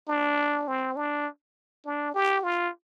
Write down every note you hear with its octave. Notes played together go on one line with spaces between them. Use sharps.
D4
C4
D4
D4
G4
F4